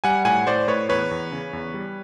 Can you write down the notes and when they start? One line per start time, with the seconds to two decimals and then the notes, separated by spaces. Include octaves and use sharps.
0.04 G3 F#5 G#5
0.25 A2 F#5 G#5
0.47 A2 C5 D5
0.68 A2 B4 C#5
0.89 E2 B4 C#5
1.11 E2
1.32 C#3
1.53 E2
1.74 G3